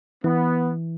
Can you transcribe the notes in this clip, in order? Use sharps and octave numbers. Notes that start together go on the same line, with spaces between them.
E3 B3